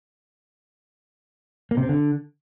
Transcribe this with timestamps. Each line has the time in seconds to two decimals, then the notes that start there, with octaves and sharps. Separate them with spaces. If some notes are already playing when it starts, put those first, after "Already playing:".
1.71 A#3
1.77 C3
1.83 C4
1.89 D3